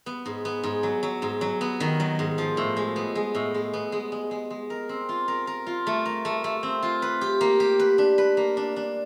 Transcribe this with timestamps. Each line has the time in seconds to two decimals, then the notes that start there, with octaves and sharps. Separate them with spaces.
0.06 B3
0.26 G#2
0.45 B3
0.63 G#2
0.83 F#3
1.03 F#3
1.22 G#2
1.41 F#3
1.61 B3
1.80 D#3
2.00 F#3
2.19 G#2
2.38 F3
2.57 A2
2.76 G#3
2.96 B3
3.15 G#3
3.35 A2
3.54 G#3
3.73 B3
3.92 G#3
4.12 G#3
4.31 G#3
4.50 G#3
4.70 A#4
4.89 C4
5.09 F4
5.28 A#4
5.47 A#4
5.67 F4
5.87 A3
6.06 A#4
6.25 A3
6.44 A3
6.63 C4
6.83 F4
7.02 B4
7.21 G4
7.41 A#3
7.60 G4
7.79 B4
7.98 D4
8.18 B4
8.37 A#3
8.57 D4
8.76 D4